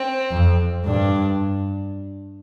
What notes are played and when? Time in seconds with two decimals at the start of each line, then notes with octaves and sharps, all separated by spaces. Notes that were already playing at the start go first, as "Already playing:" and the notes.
Already playing: C4
0.31 F2
0.85 G2 D4